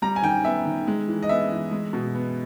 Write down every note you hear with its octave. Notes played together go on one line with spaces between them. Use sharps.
G3 A#5
G#5
D#3 G5
B3 E5
D#3
G#3
E3
D#5
B3 E5
E3
G#3
B2
B3